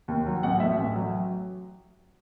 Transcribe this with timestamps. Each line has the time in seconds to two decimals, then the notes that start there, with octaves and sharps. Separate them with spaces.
0.08 D#2
0.26 F#3
0.43 A1 F#5
0.60 A2 E5
0.78 A1
0.95 F#3